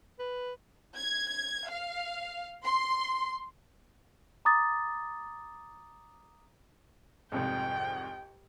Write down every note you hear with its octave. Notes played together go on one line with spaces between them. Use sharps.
B4
G#6
F5
C6
A#5 D6 D#6 A6
C2 F2 G#2 G5